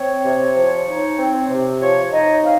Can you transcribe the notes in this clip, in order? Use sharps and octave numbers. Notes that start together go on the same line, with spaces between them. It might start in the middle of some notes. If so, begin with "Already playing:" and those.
Already playing: C4 C#5
C3
F3
D#4
C4
C3
F3 C#5
D#4 D#5
C4 F5